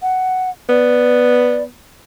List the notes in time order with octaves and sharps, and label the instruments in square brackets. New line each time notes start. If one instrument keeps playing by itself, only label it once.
[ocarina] F#5
[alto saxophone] B3 [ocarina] D5